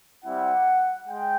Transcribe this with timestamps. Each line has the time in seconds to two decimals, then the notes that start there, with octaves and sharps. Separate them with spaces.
0.24 G3 C4 E4 F#5
1.07 G#3 G5